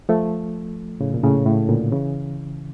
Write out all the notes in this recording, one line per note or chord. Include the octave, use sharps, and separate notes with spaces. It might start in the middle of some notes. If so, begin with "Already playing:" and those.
F3 A3
A2 C#3
A#2
A2 C#3
A2
A#2 D3
C#3 E3